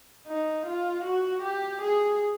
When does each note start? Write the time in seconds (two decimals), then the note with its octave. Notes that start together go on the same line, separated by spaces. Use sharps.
0.27 D#4
0.66 F4
1.04 F#4
1.42 G4
1.81 G#4